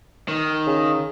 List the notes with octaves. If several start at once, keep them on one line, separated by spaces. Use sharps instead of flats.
D#3
C#3